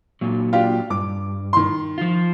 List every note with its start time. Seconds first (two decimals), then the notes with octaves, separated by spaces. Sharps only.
0.21 A#2 F#3
0.52 D4 F4 G4
0.90 G2 D6
1.53 D#3 C6
1.98 F3 F4